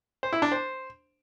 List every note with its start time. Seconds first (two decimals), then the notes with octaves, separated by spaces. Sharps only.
0.23 C5
0.33 E4
0.42 D4
0.52 C5